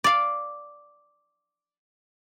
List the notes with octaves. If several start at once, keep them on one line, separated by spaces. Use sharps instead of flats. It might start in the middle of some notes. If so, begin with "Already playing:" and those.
D5 F5